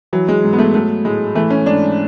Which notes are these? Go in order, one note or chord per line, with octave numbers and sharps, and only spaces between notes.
E3 F#3
G#3
G#2
B3
A3
F#3 A3
A2 G#3
E3 A3
C#4
G#2 D4